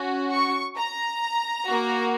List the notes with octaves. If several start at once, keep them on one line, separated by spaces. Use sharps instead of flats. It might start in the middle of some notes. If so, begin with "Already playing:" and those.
Already playing: C#4 F#4
C#6
A#5
A#3 F#4